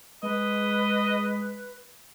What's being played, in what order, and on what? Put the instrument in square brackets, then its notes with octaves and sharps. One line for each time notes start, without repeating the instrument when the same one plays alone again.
[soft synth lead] G#3 [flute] B4 [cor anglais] D#5